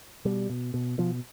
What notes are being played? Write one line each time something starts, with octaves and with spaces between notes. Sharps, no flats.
B2 G3
B2
B2
B2 F3